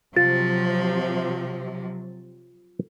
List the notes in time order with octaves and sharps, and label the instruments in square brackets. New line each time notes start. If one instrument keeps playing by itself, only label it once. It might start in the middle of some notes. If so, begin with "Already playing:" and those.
[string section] C3 F#3 [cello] F3 [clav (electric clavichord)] F4 [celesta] A6